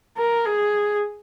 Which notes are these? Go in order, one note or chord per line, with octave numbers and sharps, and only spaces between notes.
A#4
G#4